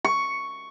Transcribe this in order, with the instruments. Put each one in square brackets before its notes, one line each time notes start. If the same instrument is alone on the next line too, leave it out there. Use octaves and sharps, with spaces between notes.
[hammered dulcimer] C#6